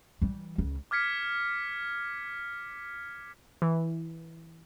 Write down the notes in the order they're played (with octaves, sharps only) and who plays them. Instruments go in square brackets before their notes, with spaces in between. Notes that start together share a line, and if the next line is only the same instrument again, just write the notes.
[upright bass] E3 G3
C#2
[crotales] D6 F6 G#6 B6 C#7
[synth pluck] E3